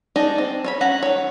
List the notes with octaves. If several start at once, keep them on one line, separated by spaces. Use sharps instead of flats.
D4 D#4 G#4
C4
D4 C#5 B5
C#4 F#5 A#5
D#3 C#5